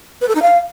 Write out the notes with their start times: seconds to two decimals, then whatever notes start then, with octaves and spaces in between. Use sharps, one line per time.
0.21 B4
0.28 A4
0.35 D#4
0.42 F5